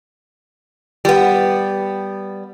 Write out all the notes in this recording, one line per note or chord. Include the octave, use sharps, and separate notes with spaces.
G3 B3